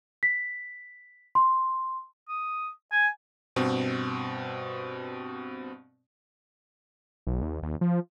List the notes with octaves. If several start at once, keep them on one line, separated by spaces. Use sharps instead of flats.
B6
C6
D#6
G#5
G2 B2 C4
B1
D#2
D#2
F3